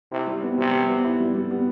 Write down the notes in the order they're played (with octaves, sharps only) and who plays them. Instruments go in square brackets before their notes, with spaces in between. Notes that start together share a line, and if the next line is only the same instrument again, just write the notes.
[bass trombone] C3 [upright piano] E4
[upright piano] G3
B3
[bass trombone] C3 [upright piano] G3
[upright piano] G3
B3
E4
G3
G3
B3